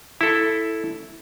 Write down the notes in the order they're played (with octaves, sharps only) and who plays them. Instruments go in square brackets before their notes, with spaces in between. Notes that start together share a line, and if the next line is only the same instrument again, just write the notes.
[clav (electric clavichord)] E4 A4